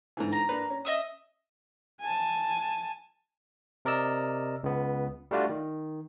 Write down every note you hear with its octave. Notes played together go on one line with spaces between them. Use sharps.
G#2 D3 E3
A#5
A#3 D4 B4
C#4
D#5 E5 D#6
G#5 A5
C3 A#4 D5 D#5 E6
C#2 B3
G3 A3 D4 F4 F#4
D#3